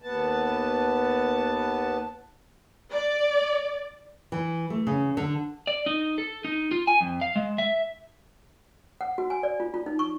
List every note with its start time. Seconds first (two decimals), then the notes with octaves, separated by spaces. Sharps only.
0.02 D#2 B3 A5
2.91 D5
4.32 E3
4.70 A3
4.87 C#3
5.17 D3
5.67 D5
5.86 D#4
6.18 A4
6.45 D#4
6.71 F4
6.87 G#5
7.01 F2
7.21 F5
7.36 G#3
7.58 E5
9.01 F#5
9.18 F#4
9.30 G#5
9.43 D5
9.60 F4
9.74 F4
9.86 D#4
9.99 C#6